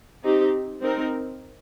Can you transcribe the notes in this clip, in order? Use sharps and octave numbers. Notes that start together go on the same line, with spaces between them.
C4 D#4 G4
C4 D#4 A#4